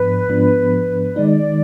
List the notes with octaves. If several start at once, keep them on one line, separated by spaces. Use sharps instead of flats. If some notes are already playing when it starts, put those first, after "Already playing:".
Already playing: G#2 F3 B3 D4 B4
G#2 F3 B3 D4
D#3 G#3 D#4 D5